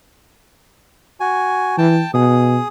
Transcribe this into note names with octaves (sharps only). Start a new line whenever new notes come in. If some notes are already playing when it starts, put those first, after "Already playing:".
F#4 G#5
E3 G5 A5
B2 G#4 D#6